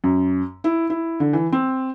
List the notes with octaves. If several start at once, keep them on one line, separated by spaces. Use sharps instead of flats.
F#2
E4
E4
D3
E3
C4